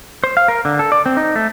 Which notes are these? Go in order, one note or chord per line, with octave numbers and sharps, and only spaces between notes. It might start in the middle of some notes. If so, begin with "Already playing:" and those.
C5
F5
A#4
D3
A4
D5
C4
D#4
A3